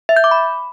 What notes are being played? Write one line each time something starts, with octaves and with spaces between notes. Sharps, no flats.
E5
G6
D6
B5